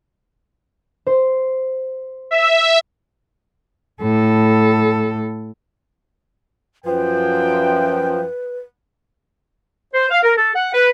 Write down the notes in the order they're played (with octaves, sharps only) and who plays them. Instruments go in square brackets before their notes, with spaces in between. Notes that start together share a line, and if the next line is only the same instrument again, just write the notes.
[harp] C5
[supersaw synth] E5
[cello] A2 A4
[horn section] F#2 F3 G5 [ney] B4
[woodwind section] C5
F5
A#4
A4
F#5
B4